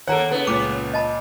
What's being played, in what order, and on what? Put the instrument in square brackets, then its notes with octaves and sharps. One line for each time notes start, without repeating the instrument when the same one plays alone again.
[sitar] D#2 A#3 A4 [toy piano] C#5 A#5 [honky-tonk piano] F#5 D7
[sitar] C#3 A3 B3
[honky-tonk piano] C#2 A#2 [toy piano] D6
[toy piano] D#5 A5 B5